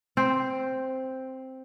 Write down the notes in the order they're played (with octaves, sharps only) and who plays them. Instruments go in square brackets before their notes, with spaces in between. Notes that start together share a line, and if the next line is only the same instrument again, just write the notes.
[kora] C4 C5